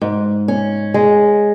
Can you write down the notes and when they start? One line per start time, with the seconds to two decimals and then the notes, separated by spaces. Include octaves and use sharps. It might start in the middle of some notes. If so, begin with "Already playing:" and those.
0.01 G#2
0.48 C#4
0.94 G#3